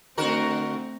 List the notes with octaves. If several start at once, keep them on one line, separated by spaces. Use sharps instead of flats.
D3 A3 C4 F#4 A#4